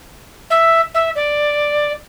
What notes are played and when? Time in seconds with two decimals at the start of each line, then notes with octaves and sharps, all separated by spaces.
0.50 E5
0.94 E5
1.15 D5